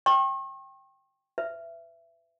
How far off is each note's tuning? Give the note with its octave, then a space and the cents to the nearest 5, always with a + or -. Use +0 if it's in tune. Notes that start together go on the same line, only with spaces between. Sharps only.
G5 +0 C#6 -45
B4 +35 E5 +20